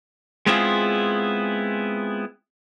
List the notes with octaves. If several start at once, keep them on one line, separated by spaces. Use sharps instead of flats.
G#3 B3 C4 E4 F4 G#4